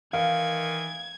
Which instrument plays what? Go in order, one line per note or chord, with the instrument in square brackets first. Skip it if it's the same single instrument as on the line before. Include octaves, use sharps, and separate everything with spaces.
[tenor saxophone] D#3 [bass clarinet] E3 [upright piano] F5 [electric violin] G#6